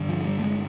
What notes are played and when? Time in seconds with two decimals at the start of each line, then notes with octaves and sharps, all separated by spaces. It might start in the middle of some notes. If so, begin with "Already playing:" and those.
Already playing: G2 D3
0.09 F3
0.26 G3
0.39 A3
0.44 G#3